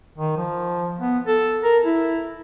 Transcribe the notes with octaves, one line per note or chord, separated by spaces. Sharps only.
D#3
F3
B3
A4
A#4
E4